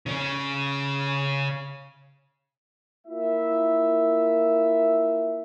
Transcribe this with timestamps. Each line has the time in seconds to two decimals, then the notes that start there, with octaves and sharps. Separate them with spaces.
0.06 C#3 C#4
3.07 A#3 E4 F4 E5